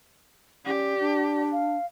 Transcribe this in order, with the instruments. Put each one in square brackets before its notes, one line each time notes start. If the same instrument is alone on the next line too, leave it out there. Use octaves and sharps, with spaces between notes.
[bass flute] C#4 [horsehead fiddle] G4 [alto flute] D5
[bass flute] D4
[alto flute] F5